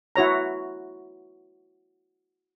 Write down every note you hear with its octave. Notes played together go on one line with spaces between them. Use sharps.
E4 F#4 C#5 A#5